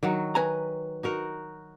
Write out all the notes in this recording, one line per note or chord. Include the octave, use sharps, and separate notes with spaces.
D#3 F#3 F#4
B4 G#5 A#5
D#4 F#4 A#4